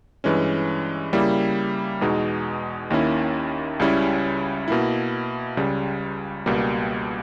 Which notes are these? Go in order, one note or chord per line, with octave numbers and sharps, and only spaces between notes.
G2 E3 G#3 C#4
C#3 G3 A#3 E4
E2 B2 G#3 D#4
D#2 D#3 A#3 C#4 E4
C#2 C#3 G3 C#4 E4
B2 A#3 E4
C#2 C#3 G3
C#2 B2 G3 A#3